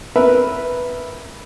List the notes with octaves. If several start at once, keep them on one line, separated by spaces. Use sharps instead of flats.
A#4 B4 E5